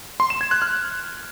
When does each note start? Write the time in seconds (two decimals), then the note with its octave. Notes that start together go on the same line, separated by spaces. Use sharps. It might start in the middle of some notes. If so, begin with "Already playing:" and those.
0.20 C6
0.30 E7
0.41 G#6
0.51 F#6
0.62 F6